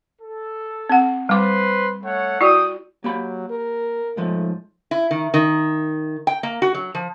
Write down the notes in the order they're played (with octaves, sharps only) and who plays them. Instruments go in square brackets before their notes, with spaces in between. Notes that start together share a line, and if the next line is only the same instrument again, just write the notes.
[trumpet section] A4
[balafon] C4 F#5
[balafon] G3 D6 [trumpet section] B4 C5 C6
[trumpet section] A3 C#5 F#5
[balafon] E4 F#4 D5 [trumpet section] G5 D#6
[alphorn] F#3 [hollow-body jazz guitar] A#3 G4 B5
[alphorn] A#4
[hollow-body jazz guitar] G#2 F3 [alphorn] A3
[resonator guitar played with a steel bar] E4
D#3
D#3
G5
A#3
F#4
F#3
F3